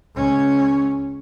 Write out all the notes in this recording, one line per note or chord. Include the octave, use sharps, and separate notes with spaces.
C#2 C#4